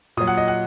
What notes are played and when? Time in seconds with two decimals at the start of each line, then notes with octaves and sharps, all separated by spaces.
0.17 A#2 F#3 D#6
0.27 F#5
0.37 D#5
0.48 F#5